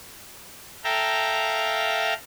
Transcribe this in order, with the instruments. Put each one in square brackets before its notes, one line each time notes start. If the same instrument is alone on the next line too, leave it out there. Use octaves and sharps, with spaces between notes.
[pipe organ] A4 E5 F5 G5 A#5